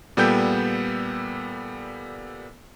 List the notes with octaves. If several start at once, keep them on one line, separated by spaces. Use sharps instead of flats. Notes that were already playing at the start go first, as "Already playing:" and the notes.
A#2 G3 B3 A4 G5 G6